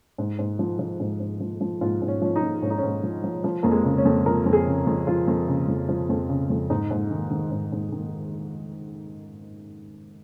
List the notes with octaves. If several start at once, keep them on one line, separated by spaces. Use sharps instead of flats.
G#2
G#2
F3
F3
G#2
G#2
F3
F3
G#2 F4
G#2
C#4
F3 C#4
D#4
F3
G#2 C#4
D#4
G#2 C#4
F3
F3
F3
F2 A#3
G#3
C#3
C#4
F2
F3 A#4
F2
G#4
C#3
F2
F3 F4
F2
C#3
F2
F3
F2
C#3
F2
G#2 D#4
G#2
D#3
D#3
G#2
G#2
D#3